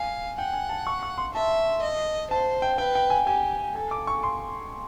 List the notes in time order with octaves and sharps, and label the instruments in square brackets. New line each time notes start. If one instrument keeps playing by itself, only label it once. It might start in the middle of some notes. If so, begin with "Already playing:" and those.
Already playing: [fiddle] F5 [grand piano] G#5
[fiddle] F#5 [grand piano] G5
[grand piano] G#5
A5
C#6
C#6
C6
[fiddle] E5 [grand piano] A5
[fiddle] D#5
[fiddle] C5 [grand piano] A5
[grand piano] G5
[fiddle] B4 [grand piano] G5
[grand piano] G5
G#5
[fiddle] G4 [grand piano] G#5
[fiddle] A4 [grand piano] G#5
[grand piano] D6
C#6
C6